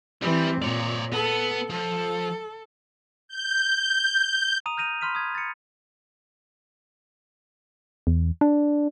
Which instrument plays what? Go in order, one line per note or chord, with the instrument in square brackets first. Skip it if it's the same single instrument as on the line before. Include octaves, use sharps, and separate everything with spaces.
[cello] E3 C4 [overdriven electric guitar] G3
[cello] A#2 [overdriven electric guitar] C#5 D5
[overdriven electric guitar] B3 [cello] A4
[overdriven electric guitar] F3 [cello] A4
[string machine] G6
[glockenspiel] A#5 D#6 D#7 F7
F6 G6 A#6 D#7 F7
B5 C6 F6 B6 D#7
D#6 G#6
A6 C#7
[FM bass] E2
D4